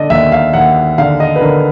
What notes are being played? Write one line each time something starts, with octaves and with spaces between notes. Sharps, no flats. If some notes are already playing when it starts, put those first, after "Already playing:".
Already playing: D3 D5 D#5
D#2 E5
F5
D#2 F#5
D3 F5
D#5
B4
D3 A#4